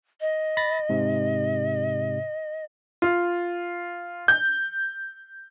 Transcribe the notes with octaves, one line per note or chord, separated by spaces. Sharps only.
D#5
B5 A6 A#6
G#2 C3
F4
G6